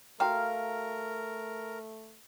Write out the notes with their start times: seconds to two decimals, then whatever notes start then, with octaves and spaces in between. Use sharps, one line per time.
0.20 A3 F#4 A#4 F5 G5 A#5